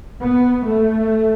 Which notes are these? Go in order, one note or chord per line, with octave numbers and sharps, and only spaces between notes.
B3
A3